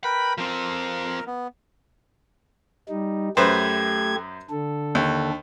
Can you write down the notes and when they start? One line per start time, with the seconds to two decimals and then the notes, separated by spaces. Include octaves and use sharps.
0.04 A#4 B4 G5 B5
0.38 F3 C4 A#4
1.27 B3
2.89 G3 D#4
3.37 F#2 A3 G4 B4 C5 G#6
4.50 D3 A4
4.95 D#2